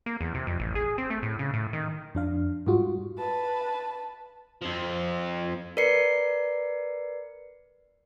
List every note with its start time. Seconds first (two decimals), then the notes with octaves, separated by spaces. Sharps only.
0.06 A#3
0.21 E2
0.34 C3
0.47 F2
0.60 A1
0.75 G#4
0.98 C4
1.10 A3
1.23 A2
1.39 C#3
1.54 A2
1.73 D#3
2.15 F2 D4 F5
2.67 G#2 G3 F4 F#4
3.18 B4 A5
4.62 F2 F3
5.77 A#4 B4 D5 C7 C#7